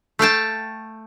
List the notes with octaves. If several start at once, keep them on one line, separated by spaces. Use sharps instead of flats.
A3 F5 G5 A5